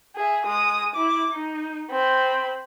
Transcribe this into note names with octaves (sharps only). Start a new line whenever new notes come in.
G#4 E5
G#3 D#6
E4 D6
D#4
C4 B5